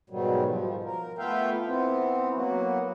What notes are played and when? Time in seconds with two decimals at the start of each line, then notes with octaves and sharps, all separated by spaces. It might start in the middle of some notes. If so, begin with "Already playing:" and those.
0.10 G#2 B2 D#3 F#3 G3
0.45 F3
0.84 A#4
1.18 A3 B3 F4 E5 F5 G5
1.65 E3 B3 C4
2.34 F#3 A#3 B3 F#4